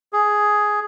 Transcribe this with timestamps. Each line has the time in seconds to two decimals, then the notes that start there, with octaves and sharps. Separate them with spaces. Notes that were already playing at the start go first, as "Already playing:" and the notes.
0.13 G#4